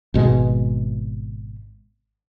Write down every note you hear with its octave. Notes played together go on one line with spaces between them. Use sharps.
G#1 B2 G#3